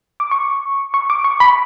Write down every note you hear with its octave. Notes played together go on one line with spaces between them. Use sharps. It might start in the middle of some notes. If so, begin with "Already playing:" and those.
D6
C#6
C#6
D6
C#6
B5